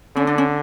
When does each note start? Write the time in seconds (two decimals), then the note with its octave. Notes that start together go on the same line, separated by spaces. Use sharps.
0.16 D3 C#4
0.27 D4
0.38 C#4